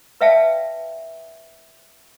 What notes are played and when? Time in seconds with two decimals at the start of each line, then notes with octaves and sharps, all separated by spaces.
0.21 B4 D5 E5 F5 G5 A5